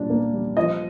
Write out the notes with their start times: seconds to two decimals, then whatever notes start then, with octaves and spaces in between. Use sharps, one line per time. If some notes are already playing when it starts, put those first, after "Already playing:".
Already playing: A#2 G3 D4
0.10 A#3
0.33 G3
0.57 F3 D#5